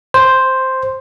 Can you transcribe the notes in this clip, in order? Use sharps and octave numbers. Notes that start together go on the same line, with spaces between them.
C5